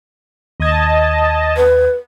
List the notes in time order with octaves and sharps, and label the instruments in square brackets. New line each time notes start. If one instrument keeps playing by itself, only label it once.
[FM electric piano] D#2 G#6 [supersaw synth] D#5 A5
[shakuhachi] B4